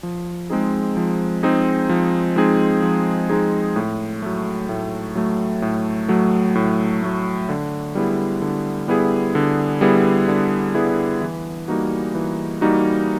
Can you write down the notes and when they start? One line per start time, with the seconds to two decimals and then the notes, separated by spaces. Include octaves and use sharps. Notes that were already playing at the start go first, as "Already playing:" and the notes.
0.03 F3
0.50 G#3 C4 D#4 G#4
0.97 F3
1.43 G#3 C4 D#4 G#4
1.89 F3
2.36 G#3 C4 D#4 G#4
2.82 F3
3.29 G#3 C4 D#4 G#4
3.76 A2
4.22 F#3 A3
4.69 A2
5.16 F#3 A3
5.62 A2
6.08 F#3 A3
6.55 A2
7.02 F#3 A3
7.49 D3
7.95 G3 B3 E4 G#4
8.42 D3
8.88 G3 B3 E4 G#4
9.35 D3
9.81 G3 B3 E4 G#4
10.28 D3
10.75 G3 B3 E4 G#4
11.21 E3
11.68 G3 A#3 D#4 F#4
12.15 E3
12.61 G3 A#3 D#4 F#4